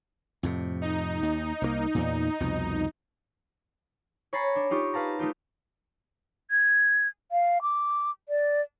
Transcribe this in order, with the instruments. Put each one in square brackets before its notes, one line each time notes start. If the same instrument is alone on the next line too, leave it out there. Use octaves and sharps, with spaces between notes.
[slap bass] F2 A2 C3
[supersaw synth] D#4
[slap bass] D#2
C2 G3 A#3
E2 A#2
C2 F2 B2
[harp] C#5 G#5 A#5 B5 A6 C7
D4
D#4 F4 G4 C#6
B4 F5 A5 A#5
A3 D#4 F4 G4
[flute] G#6
F5
D6
D5